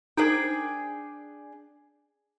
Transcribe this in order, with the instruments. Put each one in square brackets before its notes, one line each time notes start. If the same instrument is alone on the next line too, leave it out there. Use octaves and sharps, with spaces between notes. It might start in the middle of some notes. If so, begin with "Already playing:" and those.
[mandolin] D4 G#4 G5 [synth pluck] D#4 A#4 C5